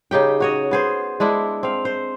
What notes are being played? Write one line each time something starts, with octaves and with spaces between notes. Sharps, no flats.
C#3 D#4 G4 G5
F#4 C#5 D#5
B3 G#4 C5
G#3 D4 E4
C4 F5
C5